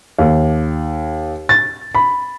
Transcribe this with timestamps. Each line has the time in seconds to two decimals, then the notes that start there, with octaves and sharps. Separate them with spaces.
0.18 D#2
1.49 A6
1.95 B5